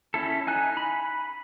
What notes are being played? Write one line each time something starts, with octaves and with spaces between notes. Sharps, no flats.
C#4 E4 A4
D#4 G#5 F#6
B5